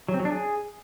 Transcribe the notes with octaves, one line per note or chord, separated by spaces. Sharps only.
F#3
C4
F#3
D4
G#4